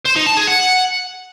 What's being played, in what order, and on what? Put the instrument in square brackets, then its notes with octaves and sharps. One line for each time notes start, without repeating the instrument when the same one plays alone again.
[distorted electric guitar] C5
D#4
A5
G#4
F#5